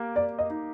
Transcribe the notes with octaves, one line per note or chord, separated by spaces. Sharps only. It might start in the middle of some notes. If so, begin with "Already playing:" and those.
Already playing: A#3 G4
A#3 D5
D#5
D#4